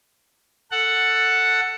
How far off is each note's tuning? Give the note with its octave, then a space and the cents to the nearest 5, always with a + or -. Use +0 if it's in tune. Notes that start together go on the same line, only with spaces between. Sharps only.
A4 +10 F#5 +0